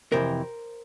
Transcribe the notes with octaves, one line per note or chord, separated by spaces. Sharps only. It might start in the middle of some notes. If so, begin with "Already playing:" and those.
F2 C3 E3 A#4 C5